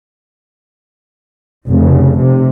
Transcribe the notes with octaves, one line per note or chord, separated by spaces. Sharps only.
F1 C#3
C3